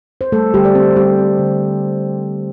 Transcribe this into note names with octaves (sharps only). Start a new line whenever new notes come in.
C5
G3 A3 A4
D3 G3 G4
D5
D3 C4 C5
G3 G4
C4
D3